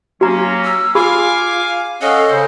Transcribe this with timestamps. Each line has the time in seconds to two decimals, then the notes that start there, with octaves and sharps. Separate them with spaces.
0.21 F#3 A#3 C#4 F#4 A#5
0.64 E6
0.95 F4 G#4 F5 G#5 B5 D6
2.02 C#4 A4 D#5 F5 F#5
2.30 C#3 C5